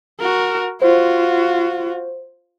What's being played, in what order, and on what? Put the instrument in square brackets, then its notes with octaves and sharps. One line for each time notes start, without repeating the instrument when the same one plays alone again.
[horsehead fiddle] F#4 A#4
[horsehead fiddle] F4 F#4 [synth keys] C5